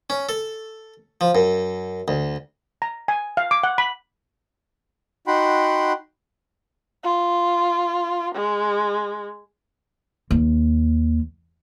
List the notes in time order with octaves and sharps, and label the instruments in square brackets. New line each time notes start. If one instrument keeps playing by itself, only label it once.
[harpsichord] C#4
A4
F3
F#2
D2
[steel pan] A#5
G#5
F5
D6
F#5
B5
[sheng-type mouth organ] D#4 F#4 F#5 G5 B5 C6
[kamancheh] F4
G#3
[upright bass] D#2